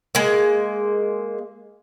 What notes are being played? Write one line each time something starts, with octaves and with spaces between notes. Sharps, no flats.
G#3 A#3